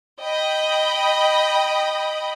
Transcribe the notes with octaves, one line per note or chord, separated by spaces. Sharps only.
D#5 G5 B5 D#6